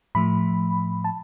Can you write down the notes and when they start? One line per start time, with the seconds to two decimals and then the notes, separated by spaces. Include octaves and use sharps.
0.15 A2 F3 A3 B5
1.04 A5